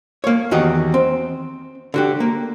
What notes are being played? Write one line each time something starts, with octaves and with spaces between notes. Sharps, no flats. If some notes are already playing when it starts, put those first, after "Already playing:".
A#3 C#5
E2 D#3 F#4 G4 D#5
C4
D3 F#4 G4
A#3